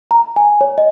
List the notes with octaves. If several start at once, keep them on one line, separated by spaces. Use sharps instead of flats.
A#5
G#5
C#5
D#5